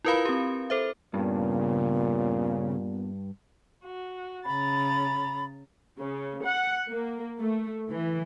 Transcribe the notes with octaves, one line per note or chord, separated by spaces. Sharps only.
E4 F4 A#4 B4 F5 B5
C4 G4
A4 C5 E5
G2 A#2 C#3 B3
F#4
C#3 A#5 B5 A6
C#3
F#5
A#3
A3
E3